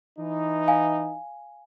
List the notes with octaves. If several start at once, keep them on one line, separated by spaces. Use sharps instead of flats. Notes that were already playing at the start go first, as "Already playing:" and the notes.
E3 D#4
F5 G#5